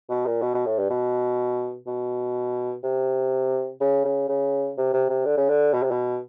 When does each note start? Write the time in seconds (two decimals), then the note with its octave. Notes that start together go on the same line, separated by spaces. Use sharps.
0.10 B2
0.26 A#2
0.42 B2
0.54 B2
0.66 A2
0.78 G2
0.90 B2
1.87 B2
2.83 C3
3.81 C#3
4.05 C#3
4.29 C#3
4.77 C3
4.93 C3
5.09 C3
5.25 D3
5.38 C#3
5.49 D3
5.73 B2
5.83 C3
5.91 B2